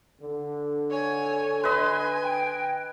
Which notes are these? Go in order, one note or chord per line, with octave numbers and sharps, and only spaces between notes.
D3
C#5 G#5
B4 D#5 G#5 C6
G5